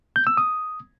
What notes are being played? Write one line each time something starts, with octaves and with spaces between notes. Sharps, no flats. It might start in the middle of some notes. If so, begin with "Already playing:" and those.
G6
E6
D#6